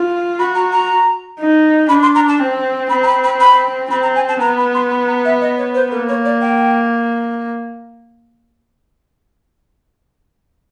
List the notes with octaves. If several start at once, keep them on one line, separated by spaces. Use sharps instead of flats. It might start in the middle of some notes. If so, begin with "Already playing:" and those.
Already playing: F4
F#4 B5
A#5
A#5
D#4
D4 B5
C6
A#5
A5
C4
C4 B5
A#5
B5
B5
B5
C4 B5
A#5
G#5
A5
B3 A#5
B5
C6
B5
A#5
E5
D#5
C#5
C5
A#3 A#4
C#5
D5
G5